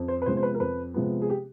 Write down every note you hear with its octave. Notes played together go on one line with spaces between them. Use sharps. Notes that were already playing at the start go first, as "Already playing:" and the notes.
Already playing: F2
C5
B4
C3 F3 G#3 B3 C5
C5
B4
A#4
F2 B4
C3 F3 G#3 B3
G#4
G4